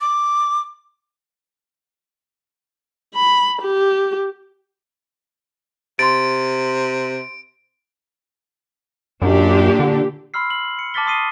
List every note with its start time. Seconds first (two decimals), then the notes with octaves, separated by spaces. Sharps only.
0.01 D6
3.15 B5
3.62 G4
5.99 C3 C6 A6 D7
9.22 F#2 A#2 D4 G4
9.79 D3
10.34 B5 C6 E6 F6 C7
10.50 F#7
10.79 C#7
10.94 A5 D6 F6 A6 B6 G7
11.06 A5 C6 D#6 C7 D#7 G7